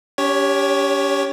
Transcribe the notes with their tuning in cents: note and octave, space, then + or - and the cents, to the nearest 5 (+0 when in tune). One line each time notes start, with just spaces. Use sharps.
C#4 +45 G4 +0 C#5 +0